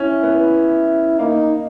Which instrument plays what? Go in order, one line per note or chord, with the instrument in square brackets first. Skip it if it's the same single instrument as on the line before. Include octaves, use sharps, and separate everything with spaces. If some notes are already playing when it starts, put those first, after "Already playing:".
Already playing: [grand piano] C#4 [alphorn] E4
[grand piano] B3
[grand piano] A#3 [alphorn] D#4